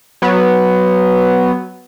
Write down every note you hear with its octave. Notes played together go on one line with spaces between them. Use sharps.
F#3 B3